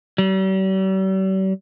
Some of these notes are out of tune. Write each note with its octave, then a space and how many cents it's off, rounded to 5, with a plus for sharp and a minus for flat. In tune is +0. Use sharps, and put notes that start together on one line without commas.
G3 -45